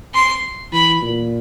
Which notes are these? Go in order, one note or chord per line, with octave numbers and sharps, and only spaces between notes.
C6
E3 B5
A#2